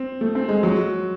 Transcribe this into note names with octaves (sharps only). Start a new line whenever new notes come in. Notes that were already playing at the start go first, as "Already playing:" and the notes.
Already playing: C4
A3
C4
G#3
F#3